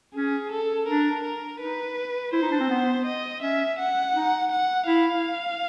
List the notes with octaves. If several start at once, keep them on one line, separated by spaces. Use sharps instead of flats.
C#4 G#4
A4
D4 A#4
A#4
D#4 B4
E4 C5
D#4
D4
C4
B3
D#5
C#4 E5
F#5
D#4
F#5
E4 F5